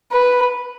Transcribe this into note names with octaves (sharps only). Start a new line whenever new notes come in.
B4